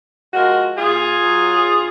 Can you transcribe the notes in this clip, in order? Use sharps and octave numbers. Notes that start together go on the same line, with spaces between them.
F3 G#3 F#4 A#4
A#2 F4 G#4
F#3
D2